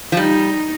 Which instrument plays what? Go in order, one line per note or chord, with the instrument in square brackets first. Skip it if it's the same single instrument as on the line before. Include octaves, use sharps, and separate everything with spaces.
[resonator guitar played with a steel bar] F3
[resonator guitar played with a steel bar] G3 [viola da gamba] D#4